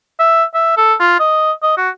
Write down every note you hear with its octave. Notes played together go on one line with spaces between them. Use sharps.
E5
E5
A4
F4
D#5
D#5
F#4